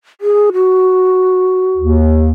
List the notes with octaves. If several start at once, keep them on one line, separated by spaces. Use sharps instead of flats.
G#4
F#4
D#2